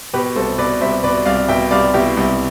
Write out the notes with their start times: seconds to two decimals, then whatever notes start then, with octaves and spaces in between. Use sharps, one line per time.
0.14 B2 G4 B4
0.36 C2 A4 C5
0.58 B2 B4 D5
0.81 C2 C5 E5
1.03 B2 B4 D5
1.26 C2 D5 F5
1.48 B2 E5 G5
1.71 C2 D5 F5
1.94 B2 E4 G4
2.17 C2